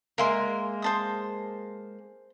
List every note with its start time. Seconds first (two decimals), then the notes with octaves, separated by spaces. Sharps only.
0.18 G#3 A#3 A#4 E5 C6
0.82 C5 A5 D#6